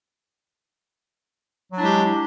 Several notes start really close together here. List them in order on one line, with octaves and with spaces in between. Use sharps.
F#3 D4 E4 G#3 G4